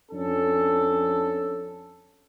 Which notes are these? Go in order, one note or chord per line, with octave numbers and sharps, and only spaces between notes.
F2 C#4 D4 A4